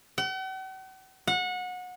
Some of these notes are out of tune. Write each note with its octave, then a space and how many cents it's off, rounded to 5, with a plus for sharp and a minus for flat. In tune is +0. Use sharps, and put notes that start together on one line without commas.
F#5 +45
F#5 -25